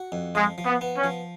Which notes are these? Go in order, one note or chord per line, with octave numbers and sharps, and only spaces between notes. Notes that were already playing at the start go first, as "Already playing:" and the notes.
Already playing: F#4
F2
F3 G#3
F3
B3
B3
C#4
F3